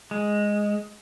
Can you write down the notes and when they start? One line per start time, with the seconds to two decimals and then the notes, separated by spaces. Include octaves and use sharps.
0.11 G#3